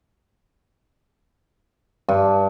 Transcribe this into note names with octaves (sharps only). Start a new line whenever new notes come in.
G2